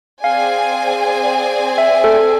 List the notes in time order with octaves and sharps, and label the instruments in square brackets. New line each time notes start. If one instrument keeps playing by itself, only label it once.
[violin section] C4 G#4 D5 G#5 [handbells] F5
[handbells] E5
A4